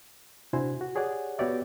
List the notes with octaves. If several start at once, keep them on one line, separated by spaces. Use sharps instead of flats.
C3 D4 E4 F#4 C5 G#5
F#4
G4 G#4 C#5 D5 F#5 G#5
B3 F#4 G4 C#5 D5 E5